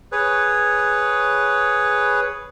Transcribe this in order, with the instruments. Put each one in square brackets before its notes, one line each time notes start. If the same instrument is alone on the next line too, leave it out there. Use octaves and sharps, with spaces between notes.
[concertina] G#4 B4 C#5